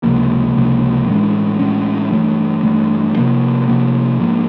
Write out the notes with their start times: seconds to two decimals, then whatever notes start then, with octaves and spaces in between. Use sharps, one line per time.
0.03 C#2 C3 F3 A#3
0.55 C#2 C3 F3 A#3
1.07 A2 E3 G#3 C#4
1.59 A2 E3 G#3 C#4
2.11 G2 E3 A3
2.63 G2 E3 A3
3.16 C3 F3 A#3
3.68 C3 F3 A#3
4.20 G#2 F3 A#3